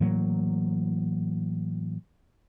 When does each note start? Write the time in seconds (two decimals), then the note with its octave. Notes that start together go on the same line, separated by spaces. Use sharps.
0.01 A2 E3 F#3 A#3